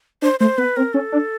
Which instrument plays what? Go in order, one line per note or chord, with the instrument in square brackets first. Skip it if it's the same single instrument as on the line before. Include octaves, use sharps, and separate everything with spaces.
[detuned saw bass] D4 [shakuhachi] C5
[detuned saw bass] A3 [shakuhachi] C5
[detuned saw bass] B3 [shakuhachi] B4
[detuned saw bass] C4 [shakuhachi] A#4
[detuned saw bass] C#4 [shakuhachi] A4
[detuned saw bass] D4